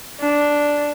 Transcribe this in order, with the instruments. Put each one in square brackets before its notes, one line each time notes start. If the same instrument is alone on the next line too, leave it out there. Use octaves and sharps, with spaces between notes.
[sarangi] D4